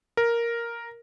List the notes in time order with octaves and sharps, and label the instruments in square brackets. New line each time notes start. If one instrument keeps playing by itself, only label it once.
[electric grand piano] A#4